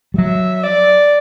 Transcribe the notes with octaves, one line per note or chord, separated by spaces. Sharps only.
G3
F#3 E5
D5